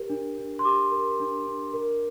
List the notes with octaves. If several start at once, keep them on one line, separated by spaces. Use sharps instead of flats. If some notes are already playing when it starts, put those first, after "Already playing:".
Already playing: G4 A#4
D4
D4
C6
G4 D6
A#4
D4
D4
A#4